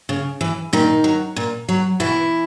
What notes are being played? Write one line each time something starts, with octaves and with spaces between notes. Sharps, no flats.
C#3
E3
A#2 D#3 D#4
F#3
A#2
F#3
B2 E3 E4